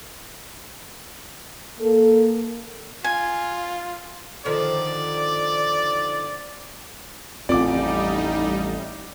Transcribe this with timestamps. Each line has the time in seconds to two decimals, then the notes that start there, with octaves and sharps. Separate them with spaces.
1.81 A#3 A4
3.04 F4 G#5
4.45 D3 D#3 F3 D5
7.49 A1 F2 G3 C4 D#4 F4 D5 D6